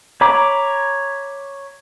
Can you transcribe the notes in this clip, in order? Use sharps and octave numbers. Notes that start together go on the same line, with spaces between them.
C#5 A#5 B5 D6